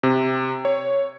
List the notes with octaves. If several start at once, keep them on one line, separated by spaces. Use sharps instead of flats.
C3
C#5